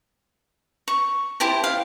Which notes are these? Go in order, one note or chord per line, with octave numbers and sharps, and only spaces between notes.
C#6
E4 G4 C5 A5
F5